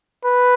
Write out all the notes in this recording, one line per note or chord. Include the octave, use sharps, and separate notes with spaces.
B4